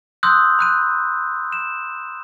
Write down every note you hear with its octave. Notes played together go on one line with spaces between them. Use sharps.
C6 D#6 E6 F#6 G6
B5 F#6 D#7
E7